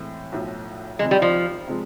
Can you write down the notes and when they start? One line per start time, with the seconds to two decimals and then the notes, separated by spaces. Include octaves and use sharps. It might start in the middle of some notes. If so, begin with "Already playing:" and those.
Already playing: A2 E3 G#3 C4
0.32 B1 A2 F3
0.99 D#3 G#3
1.02 F2 C3
1.11 G3
1.22 F3
1.68 C3 F3 G#3